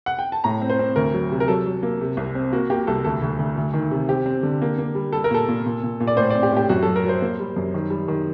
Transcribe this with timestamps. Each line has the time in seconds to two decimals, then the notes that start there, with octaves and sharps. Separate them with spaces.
0.06 F#5
0.19 G5
0.32 A5
0.44 A2 A#5
0.62 C4
0.70 C5
0.79 C4
0.96 D2 A#4
1.14 F#3
1.32 C3
1.40 A#4
1.48 F#3 A4
1.66 F#3
1.83 A#3
2.01 C3
2.17 C2
2.35 C4
2.52 A#3 F#4
2.70 A#3 G4
2.87 C2 A4
3.04 D2 A4
3.22 D2
3.39 D2
3.57 D2
3.74 D#3
3.91 C3
4.09 C4 G4
4.26 C4
4.43 D3
4.62 A#3
4.78 A#3
4.95 G3
5.12 G3 A4
5.24 A#4
5.31 A#2 A4
5.48 A#2
5.66 A#2
5.83 A#2
6.00 A#2
6.07 D5
6.17 A2 C5
6.30 C4 D5
6.43 G4
6.51 A2
6.57 G4
6.69 F#2 F#4
6.83 F#3 A4
6.96 A#4
7.05 F#3 C5
7.22 A#3
7.40 G3
7.56 F#2
7.74 D#3
7.90 G3
8.08 D#3